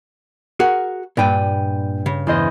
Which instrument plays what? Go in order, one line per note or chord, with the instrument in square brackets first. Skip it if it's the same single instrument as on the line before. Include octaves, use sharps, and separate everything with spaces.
[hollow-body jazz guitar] F#4 G#4 A#4
[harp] G2 G5 D#7 [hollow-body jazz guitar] A#2 D4
[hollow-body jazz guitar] C#3
[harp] E2 C5 D#5